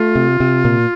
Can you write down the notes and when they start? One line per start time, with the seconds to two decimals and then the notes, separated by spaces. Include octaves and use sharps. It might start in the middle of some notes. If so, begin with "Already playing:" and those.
Already playing: A3 F4
0.15 C3
0.40 C3
0.65 A#2